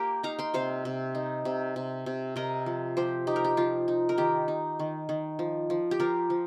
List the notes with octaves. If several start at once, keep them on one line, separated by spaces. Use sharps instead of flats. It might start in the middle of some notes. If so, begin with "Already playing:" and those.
Already playing: A#3 G4 A#4
D#4 F5 A#5
G5 C6
C3 C5 F5
C3
D#4
C3
C3
C3
C3 A#4 D#5
F3
F3 G4 C5
D#4 G4
A#4
G4
F3 F4
D#4
A#4
D#3 G4
D#4
D#3
D#3
F3
F3
G4
F3 F4 A#4
F3